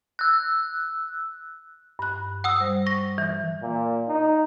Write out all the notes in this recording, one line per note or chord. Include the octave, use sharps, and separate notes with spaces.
E6 F#6
G2 F#6
F#5 D#6 E6
G3 C5
C#6 A#6
E3
A#2
D#4